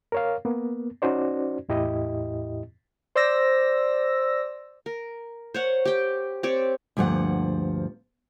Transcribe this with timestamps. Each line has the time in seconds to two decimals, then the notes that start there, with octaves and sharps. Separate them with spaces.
0.12 A#4 C#5 F5
0.45 A#3 B3
1.02 C#4 D#4 F#4 C5 D5
1.69 E2 A2 E4 G4 D#5
3.15 C5 D5 E6 A#6
4.86 A#4
5.54 C5 C#5 F#5
5.85 G4 G5
6.43 C4 G4 C#5 D5
6.97 D2 G2 F3 A#3 F#5